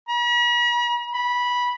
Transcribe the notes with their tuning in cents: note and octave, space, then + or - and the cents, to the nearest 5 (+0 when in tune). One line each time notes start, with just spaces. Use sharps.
B5 -45
B5 -15